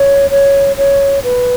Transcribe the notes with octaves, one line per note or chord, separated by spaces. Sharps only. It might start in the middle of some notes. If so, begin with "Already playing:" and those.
Already playing: C#5
C#5
C#5
B4